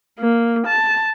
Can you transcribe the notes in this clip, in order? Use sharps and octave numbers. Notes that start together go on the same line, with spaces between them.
A#3
A5